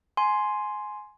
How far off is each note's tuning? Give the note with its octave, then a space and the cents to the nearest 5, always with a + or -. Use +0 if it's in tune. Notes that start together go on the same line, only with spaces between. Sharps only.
G#5 +15 C6 +0